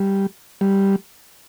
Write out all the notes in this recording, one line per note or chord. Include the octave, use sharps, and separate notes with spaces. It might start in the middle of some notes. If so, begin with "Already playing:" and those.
Already playing: G3
G3